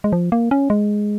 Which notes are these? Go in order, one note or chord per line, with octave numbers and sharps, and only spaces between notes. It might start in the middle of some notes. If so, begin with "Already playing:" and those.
G#3
F3
A#3
C#4
G#3